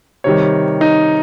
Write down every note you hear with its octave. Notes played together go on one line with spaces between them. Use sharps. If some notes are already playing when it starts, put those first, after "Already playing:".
C3 D#3 G3 C#5
D#4